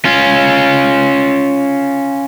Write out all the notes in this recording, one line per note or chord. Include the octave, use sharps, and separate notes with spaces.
C#4 F4